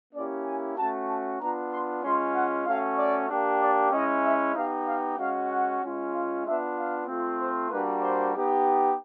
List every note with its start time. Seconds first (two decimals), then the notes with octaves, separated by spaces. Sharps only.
0.13 A#3 C#4 E4 G4 D5
0.46 G#5
0.77 A3 C#4 F#4 A5
1.09 A5
1.40 B3 D4 F4 A#5
1.72 C6
2.03 G#3 C#4 F4 C6
2.35 F#5
2.66 A3 C#4 F#4 F5
2.98 D5
3.30 A#3 D4 G4
3.61 D5
3.92 G#3 C#4 E4 D#5
4.24 E5
4.56 B3 D#4 G4 F5
4.88 F5
5.19 G#3 C#4 F#4 F5
5.50 F#5
5.82 G#3 C#4 F4
6.13 F5
6.45 B3 D4 F4 E5
6.76 F5
7.07 A3 C4 F4
7.39 C5
7.71 G3 A#3 D4 F#4 B4
8.02 C5
8.35 B3 D#4 G4